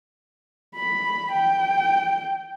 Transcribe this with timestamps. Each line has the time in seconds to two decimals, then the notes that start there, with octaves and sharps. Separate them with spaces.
0.76 B5
1.32 G5